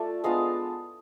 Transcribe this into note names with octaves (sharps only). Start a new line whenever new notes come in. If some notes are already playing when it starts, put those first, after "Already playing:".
Already playing: A3 F4 D5 E5
G#3 B3 D4 F4 D#5 F5